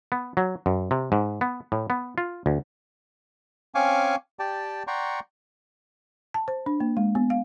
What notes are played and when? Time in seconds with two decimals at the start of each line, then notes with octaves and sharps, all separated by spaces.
0.12 B3
0.37 F#3
0.66 F#2
0.91 C3
1.12 G#2
1.41 B3
1.72 A2
1.90 B3
2.18 F4
2.46 D2
3.75 C4 C#4 F5 G#5 C#6 D6
4.39 G4 D5 G5 A5
4.87 D5 F#5 G5 A#5 C6 C#6
6.34 A5
6.48 C5
6.66 D4
6.80 A#3
6.97 G#3
7.15 B3
7.30 F5